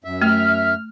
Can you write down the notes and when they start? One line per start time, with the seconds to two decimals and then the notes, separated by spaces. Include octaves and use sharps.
0.04 F#2 E5
0.22 A3 F6